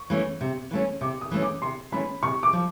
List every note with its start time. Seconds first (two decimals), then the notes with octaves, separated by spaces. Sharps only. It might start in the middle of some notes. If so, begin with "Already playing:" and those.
Already playing: C#6
0.10 E3 A3 C#4
0.41 C3
0.71 E3 A3 C#4
1.01 C3 D6
1.21 D#6
1.31 E3 A3 C#4
1.42 D6
1.62 C3 C6
1.92 E3 A3 C#4 B5
2.23 C3 C#6
2.43 D6
2.53 F3